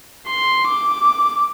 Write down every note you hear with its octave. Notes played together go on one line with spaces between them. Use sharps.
C6
D6